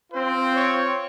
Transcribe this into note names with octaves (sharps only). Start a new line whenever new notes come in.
C4 F4 C5
C#5